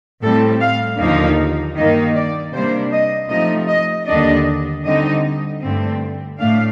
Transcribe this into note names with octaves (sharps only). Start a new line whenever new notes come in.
A2 G3 C4 A4
F5
D#2 D3 F3 A#3 D#4 F5
G2 D#3 A#3 D#4 D#5
D5
C3 G3 A#3 D4 C5
D#5
C3 F3 A3 D#4 D#5
D#5
D#2 D3 G3 D4 D#5
D3 G3 C4 D#4 D#5
G2 D3 A3 C4
A2 A3 D4 F5